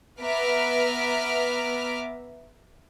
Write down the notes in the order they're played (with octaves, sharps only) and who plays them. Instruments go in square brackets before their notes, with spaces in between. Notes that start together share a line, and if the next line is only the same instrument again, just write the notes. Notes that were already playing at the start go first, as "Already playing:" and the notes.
[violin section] B3 B4 E5 A#5 D6 F6